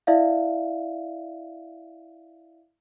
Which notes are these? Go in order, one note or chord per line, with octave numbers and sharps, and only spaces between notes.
E4 D5 E5 F5